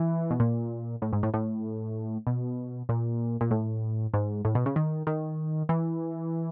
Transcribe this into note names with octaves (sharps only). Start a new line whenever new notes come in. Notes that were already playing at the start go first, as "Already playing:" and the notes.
Already playing: E3
B2
A#2
A2
G#2
A2
A2
B2
A#2
A#2
A2
G#2
A2
B2
C#3
D#3
D#3
E3